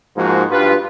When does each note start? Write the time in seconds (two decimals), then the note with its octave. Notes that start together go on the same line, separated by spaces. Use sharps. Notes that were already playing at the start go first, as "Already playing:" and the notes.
0.16 G#2 F3 G#3 A#3 D#4 F#4
0.49 G2 F4 B4